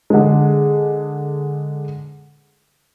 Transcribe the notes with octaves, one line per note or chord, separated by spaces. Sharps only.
D3 G#3